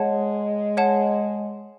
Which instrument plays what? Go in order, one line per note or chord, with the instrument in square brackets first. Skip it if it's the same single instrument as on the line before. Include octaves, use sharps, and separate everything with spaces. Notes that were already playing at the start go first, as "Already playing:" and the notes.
Already playing: [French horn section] G#3 [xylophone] C#5 F#5 A5
[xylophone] C#5 F#5 A5